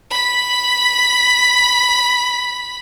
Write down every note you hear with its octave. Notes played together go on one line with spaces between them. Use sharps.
B5 B6